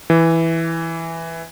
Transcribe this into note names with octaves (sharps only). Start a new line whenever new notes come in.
E3